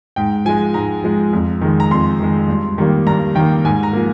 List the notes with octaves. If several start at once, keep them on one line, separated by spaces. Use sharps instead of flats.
G#2 G5
F3 G#3 G#5
G#2 A#5
F3 G#3
F2
D#3 G#3
A#5
F2 C6
D#3 G#3
G2
D#3 G3 A#3
G2 A#5
D#3 G3 A#3 G5
G#2 G#5
A#5
F3 A#3